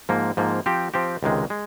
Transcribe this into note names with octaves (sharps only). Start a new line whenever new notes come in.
G#2 F3 A#3
G#2 F3 A#3
F3 C4 G4
F3 C4 G4
C#2 C3 D#3 G#3
G#3